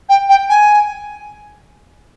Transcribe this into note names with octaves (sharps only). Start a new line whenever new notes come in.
G5
G5
G#5